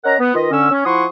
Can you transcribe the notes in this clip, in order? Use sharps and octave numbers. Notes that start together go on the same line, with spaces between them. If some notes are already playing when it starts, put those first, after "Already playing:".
C#4 A#4 D#5 F#5 A#5
B3
D#3 F4 B4 D#5
D3 C#4 E6
C#4
F3 E4 F#5 C6 C#6 D#6